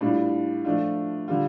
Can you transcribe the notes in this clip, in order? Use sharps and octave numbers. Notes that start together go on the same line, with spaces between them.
A2 G3 D4 F4
F3 A3 D4 F4
D3 G3 F4